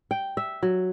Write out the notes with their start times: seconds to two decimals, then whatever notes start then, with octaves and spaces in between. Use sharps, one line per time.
0.11 G5
0.37 E5
0.63 F#3